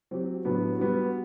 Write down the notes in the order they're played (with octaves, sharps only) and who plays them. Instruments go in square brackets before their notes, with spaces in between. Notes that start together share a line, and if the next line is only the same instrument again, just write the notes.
[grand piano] F#3 C4 G4
A2 F#3 B3 D4
G3 B3 F#4